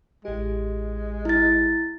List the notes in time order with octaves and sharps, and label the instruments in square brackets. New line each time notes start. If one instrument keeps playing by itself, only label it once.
[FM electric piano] A1 G4 [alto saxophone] G#3
[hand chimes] E4 A6